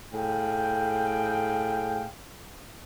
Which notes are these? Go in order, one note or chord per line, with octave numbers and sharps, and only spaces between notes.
A2 G#4 F5 G5